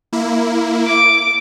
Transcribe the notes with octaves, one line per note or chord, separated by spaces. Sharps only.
A#3 E4
D6